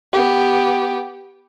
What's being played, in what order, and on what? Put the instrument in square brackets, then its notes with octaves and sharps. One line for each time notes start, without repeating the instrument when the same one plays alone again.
[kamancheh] B3 G4